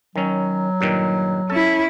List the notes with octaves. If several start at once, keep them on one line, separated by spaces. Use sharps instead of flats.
D#3 F#3 C#4
G2 A#2 D#3
C#4 E4 A4